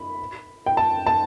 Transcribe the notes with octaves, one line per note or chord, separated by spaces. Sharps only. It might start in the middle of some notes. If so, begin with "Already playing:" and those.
Already playing: B5
G5
A5
A5